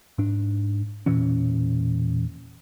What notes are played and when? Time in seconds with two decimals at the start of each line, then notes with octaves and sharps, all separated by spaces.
0.18 G#2 D4
1.06 E1 A#2 E3 C#4